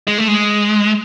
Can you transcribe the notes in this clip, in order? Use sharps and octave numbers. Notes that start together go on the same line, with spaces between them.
G#3
A3
G#3